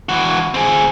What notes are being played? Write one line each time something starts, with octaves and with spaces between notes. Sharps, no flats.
E3 F#4
C4 G#4